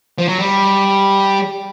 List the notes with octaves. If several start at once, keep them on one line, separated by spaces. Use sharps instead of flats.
F3
F#3
G3